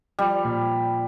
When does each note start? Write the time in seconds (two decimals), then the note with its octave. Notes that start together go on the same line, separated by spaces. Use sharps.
0.19 F3 G3
0.45 A#2